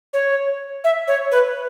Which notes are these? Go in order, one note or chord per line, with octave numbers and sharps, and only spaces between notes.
C#5
E5
C#5
B4